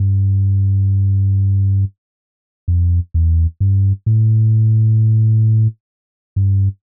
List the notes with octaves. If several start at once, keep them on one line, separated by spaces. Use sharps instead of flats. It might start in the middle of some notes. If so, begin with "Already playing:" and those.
Already playing: G2
F2
E2
G2
A2
G2